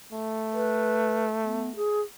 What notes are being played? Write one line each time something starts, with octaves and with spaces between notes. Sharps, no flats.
A3
B4
B3
G#4